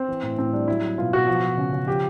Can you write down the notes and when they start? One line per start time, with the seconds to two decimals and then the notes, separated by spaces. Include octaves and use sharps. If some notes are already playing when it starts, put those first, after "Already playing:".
Already playing: C4
0.08 E3
0.23 A2
0.38 A2 C4
0.53 G3 D4
0.68 F#3 E4
0.83 F#3
0.98 B2 F4
1.13 B2 F#4
1.27 F3
1.43 F3
1.58 C#3
1.73 C#3
1.87 F3 G4